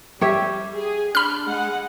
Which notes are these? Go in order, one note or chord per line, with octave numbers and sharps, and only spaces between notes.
G3 G4 C#5 E5
G#4
D4 B5 F6
G#3 F#5